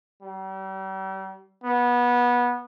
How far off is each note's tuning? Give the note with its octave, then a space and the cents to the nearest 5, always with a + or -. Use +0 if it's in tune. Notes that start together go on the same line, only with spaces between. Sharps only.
G3 -40
B3 -20